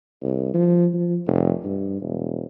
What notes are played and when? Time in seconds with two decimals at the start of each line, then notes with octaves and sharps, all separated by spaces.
0.23 C2
0.54 F3
0.94 F3
1.27 F1
1.65 G2
2.02 E1